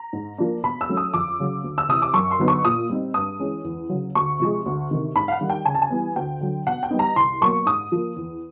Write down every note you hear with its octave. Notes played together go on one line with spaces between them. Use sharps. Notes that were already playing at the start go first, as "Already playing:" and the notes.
Already playing: A#5
G#2
F3 A#3 D4
B2 B5
E6
F#3 A3 C#4
D#6
F2 D6
C#3 F#3
D2
E6
C3 E3 D#6
D6
F#2 C#6
C6
D3 F#3 B3 D#4
C#6
A#2 D#6
G3 C4 D#4
G2 D#6
E3 G#3 C#4
E2
C#3 F#3
D2 C#6
C3 F3 G#3
D2
C3 D#3
G#2 B5
F5
F#5
D#3 G3
G5
C#3 G#5
A5
G#5
E3 G3 B3
D2 G5
D3 F#3
B2 F#5
G5
G3 B3 D#4
A#5
C2 C6
B2 F#3 A#3 C#6
G#2 D#6
F3 A#3
E2